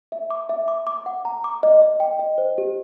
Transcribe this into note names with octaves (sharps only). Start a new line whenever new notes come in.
E5
D6
E5
D6
D6
F#5
A#5
D6
D#5
D#5
G5
D#5
C5
G4